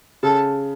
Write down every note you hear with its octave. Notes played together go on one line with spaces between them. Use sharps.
C#3 A4